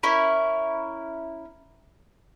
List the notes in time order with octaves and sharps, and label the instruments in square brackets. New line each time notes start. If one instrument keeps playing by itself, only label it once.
[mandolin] C#4 E4 A#4